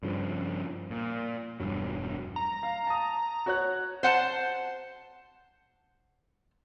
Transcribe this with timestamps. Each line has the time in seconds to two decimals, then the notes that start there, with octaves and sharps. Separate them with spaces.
0.03 G2 C#3 F3
0.90 A#2
1.60 E1 G2 F#3
2.36 A#5
2.63 F5
2.87 A5 D#6
3.46 F#4 C#5 F#6
4.03 C5 F#5 G#5 A5